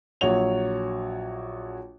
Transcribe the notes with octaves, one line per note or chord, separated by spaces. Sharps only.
A#1 F#3 F#4 C#5 F7